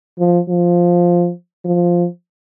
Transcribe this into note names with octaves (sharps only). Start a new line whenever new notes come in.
F3
F3
F3